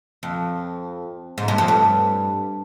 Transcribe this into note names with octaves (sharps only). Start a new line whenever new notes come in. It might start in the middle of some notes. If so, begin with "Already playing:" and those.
F2
G#2
G2
F2
G2